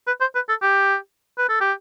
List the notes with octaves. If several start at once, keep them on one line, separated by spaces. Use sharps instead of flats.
B4
C5
B4
A4
G4
B4
A4
G4